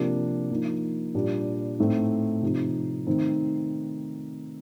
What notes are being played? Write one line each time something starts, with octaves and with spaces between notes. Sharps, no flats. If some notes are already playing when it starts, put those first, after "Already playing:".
Already playing: C3 F3 A#3 D4
F3 A#3 D#4
A#2 G3 D4
A2 A3 C4 D#4
C3 F3 C4 D#4
D#3 A3 C4 D#4